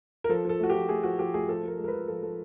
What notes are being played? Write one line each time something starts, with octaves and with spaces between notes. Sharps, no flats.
A#4
F3 A4
F3 A4
A3 F#4
F3 G4
A3 G#4
F3 F#4
F3 G4
A3 G#4
F3 A4
F3 A#4
G#3
A#4
B4
F3
F3 A4
F3 A4